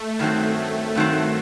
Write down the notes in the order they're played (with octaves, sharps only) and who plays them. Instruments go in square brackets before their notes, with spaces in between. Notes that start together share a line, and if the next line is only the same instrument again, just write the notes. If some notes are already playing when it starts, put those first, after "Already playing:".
Already playing: [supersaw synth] A3
[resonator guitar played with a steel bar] G2 D#3 F#3 C4
[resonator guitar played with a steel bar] G2 D#3 F#3 C4 [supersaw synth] A3